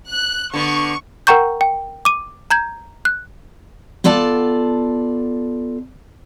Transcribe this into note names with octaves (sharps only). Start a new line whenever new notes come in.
F#6
D3 B3 C#6
A#4 F#5 G5 A#5 C#6 G6
G5
D6 D#7
A#5 G6 G#6
F#6
B3 F4 A4 D5 A5